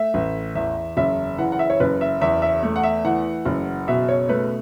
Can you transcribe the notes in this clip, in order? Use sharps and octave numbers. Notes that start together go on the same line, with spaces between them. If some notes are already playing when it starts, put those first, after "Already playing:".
Already playing: A3 E5
A1
E2 E5
F#1 E5
E3 F#5
F#5
E5
C#5
F#1 B4
E5
E2 E5
E5
A3
F#5
E5
E3 F#5
F#1
B2 E5
C#5
A3 B4